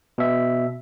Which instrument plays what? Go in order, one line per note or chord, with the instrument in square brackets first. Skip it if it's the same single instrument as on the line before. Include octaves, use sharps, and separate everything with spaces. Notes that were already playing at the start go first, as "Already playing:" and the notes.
[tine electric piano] B2 E5